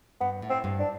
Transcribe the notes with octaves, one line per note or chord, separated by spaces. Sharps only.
G2 B3
A2
C4
G2
D4